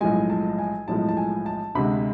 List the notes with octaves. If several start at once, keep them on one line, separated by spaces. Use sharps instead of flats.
B1 A2 F3 G#3 G#5
A5
G#5
B1 A2 F3 G#3 A5
A5
G#5
A5
D2 C3 G#3 B5